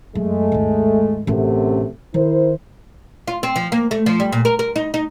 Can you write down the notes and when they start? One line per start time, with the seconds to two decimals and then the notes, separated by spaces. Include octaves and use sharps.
0.15 F#2 G#3 A3
0.52 G#1 D#2
1.27 A1 F#2 C3 A3 B3
2.14 D#3 E4 A#4 C5
3.28 F4
3.43 C4
3.56 F3
3.72 A#3
3.91 A3
4.06 F3
4.20 G3
4.32 A#2
4.45 A#4
4.59 A#4
4.76 D#4
4.94 D#4